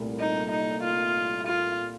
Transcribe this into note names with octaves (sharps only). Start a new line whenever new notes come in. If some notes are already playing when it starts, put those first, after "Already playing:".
Already playing: C2 A#2 A3
D#4
D#4
F4
F4